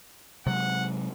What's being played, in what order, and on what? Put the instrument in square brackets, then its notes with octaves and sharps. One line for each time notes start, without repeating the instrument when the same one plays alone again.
[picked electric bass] C3 F#3 G#3 [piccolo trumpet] F#5